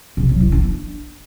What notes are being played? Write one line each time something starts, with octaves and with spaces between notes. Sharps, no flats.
C3
F#3
E4
D4